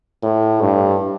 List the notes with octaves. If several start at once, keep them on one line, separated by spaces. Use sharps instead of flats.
A2
G2